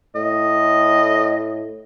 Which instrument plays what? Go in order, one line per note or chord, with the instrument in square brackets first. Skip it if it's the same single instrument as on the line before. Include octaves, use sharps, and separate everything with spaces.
[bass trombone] A2 [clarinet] D#5